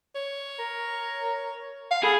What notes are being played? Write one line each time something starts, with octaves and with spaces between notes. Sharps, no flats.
C#5
A#4
F5
G#4 A4 B5